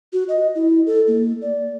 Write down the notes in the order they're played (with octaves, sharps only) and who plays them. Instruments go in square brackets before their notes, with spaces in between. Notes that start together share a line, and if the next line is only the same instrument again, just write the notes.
[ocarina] F#4
D#5
E4
A4
A#3
D5